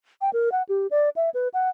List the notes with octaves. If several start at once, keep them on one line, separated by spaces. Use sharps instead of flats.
G5
A#4
F#5
G4
D5
E5
B4
F#5